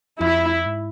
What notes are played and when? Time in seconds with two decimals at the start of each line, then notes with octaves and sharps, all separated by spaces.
0.21 F2 E4
0.66 G#2